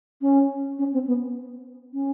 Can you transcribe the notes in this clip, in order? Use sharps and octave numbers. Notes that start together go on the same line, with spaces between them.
C#4
C#4
C4
B3
C#4